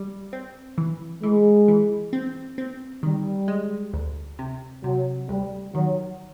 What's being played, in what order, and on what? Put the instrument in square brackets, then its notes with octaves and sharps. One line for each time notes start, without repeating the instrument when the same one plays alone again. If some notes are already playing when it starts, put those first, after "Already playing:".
Already playing: [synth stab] G3
C4
E3
[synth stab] E3 [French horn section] G#3
[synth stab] E3
C4
C4
[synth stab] D#3 [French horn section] G3
[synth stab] G#3
D2
C3
[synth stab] C3 [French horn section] F#3
[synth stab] D2 [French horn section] G3
[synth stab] D#3 [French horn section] F#3